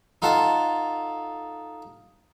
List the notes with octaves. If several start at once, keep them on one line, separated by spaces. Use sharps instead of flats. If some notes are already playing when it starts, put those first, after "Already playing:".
D#4 F4 A4 F#5 A5